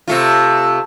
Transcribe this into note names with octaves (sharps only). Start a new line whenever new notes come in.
C3 A3 F4